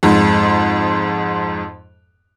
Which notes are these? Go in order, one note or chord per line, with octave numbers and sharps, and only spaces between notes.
F2 G#2